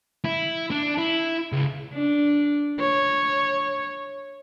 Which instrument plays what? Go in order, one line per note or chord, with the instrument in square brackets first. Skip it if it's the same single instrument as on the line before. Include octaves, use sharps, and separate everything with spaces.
[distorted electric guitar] E4
D4
E4
C#2
[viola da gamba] D4
C#5